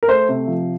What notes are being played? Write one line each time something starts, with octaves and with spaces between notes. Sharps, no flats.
A#4
A3 C5
C3
F3